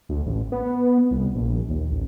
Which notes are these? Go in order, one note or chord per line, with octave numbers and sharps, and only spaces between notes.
D2
A1
B3
C2
A#1
D#2
A1